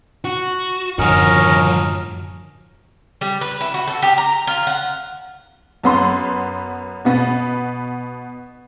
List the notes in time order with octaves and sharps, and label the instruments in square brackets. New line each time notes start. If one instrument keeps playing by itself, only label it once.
[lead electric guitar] F#4
[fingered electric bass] F#2 A2 D3 [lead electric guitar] F3 F#4 [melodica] C#4 A#4 D#5
[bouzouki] G3
B4
E4
F#4
A4
G4
A#5
F4
F#5
[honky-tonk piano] F#2 B3 C6
B2 B3